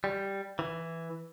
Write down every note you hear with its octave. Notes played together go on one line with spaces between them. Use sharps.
G3
E3